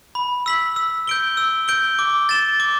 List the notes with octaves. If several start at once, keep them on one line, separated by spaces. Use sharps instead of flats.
B5
E6 B6 F#7
E6
G6 D7 G7
E6
G6 D7 G7
D6
A6 E7 G7
D6